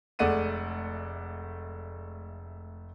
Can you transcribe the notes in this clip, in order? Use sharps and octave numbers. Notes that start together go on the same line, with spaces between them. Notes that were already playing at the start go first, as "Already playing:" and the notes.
F1 G#3 A3 D5 F#5 D#7